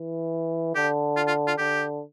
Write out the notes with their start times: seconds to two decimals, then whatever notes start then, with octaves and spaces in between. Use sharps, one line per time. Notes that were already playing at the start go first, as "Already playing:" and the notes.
Already playing: E3
0.75 D3 G4
1.16 F4
1.27 F4
1.47 F4
1.58 D3 G4